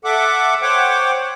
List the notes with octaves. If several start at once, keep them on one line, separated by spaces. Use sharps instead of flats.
A4 E5 F#5 D6
C5 C#5 F#5 G5 D6